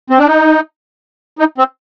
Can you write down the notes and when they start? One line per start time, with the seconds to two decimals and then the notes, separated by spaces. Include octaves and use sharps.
0.10 C4
0.19 D4
0.27 D#4
1.39 D#4
1.58 C4